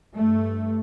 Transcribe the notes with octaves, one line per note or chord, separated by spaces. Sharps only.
G2 A3